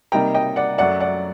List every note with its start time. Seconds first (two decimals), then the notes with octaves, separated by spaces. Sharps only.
0.12 C3 G3 A#3 D#4 G5 A#5
0.34 D#5 G5
0.56 D5 F#5
0.78 F#2 F#3 A3 D5 F#5
1.00 D5 F#5